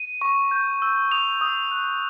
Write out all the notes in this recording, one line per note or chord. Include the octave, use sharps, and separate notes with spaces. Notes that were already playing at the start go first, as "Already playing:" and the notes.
Already playing: D#7
C#6
G6
E6
D#6 F7
D#6
F#6